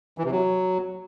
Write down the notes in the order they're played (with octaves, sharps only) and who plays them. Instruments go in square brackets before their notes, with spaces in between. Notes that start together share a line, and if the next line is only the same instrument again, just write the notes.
[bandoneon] E3
C3
F#3